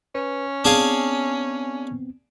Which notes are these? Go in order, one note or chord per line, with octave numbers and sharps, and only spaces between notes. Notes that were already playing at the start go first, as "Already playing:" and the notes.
C#4 B4
B3 C4 D4 G#4 F5